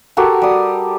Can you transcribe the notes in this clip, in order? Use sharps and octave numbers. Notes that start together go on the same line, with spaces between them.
F#4 G4 A4 A#4
G3 D#6